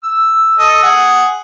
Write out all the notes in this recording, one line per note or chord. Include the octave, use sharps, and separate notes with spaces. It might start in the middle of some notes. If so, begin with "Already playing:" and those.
E6
A4 D#5
G#4 F#5